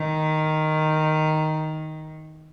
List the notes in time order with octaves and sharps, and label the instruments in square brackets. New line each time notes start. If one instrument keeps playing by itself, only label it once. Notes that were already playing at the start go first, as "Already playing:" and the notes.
Already playing: [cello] D#3